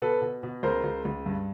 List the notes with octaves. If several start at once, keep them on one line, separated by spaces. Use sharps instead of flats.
B2 A4 B4
B2
B2
C#2 A#4 C5
C#2
C#2
G2